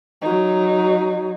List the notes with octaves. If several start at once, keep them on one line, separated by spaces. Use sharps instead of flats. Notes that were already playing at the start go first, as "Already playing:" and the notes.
F#3 D#4